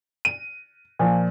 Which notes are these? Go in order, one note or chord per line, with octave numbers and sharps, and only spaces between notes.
D#7
A#2 F3